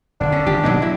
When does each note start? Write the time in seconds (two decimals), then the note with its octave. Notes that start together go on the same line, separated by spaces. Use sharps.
0.20 D#1 D3 D4
0.32 D3 C#4
0.47 F#1 D#3 F3 G4
0.63 D1 B2 F#3 A#3 D#4
0.82 F#3 E4